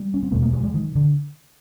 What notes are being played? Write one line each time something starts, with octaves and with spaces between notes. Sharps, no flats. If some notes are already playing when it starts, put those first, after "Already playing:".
Already playing: G3
C#4
C4
E2 B2 A3 B3
G#3 A#3
F#3 G#3
F#3 G#3
D#3
D3